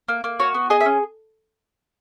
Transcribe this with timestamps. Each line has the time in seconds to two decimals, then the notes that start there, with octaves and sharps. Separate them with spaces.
0.08 A#3
0.24 A#3
0.40 F#4 C#5
0.54 B3
0.70 G#4 D#5
0.81 E5
0.86 C#4